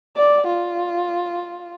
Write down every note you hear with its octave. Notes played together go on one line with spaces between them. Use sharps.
D5
F4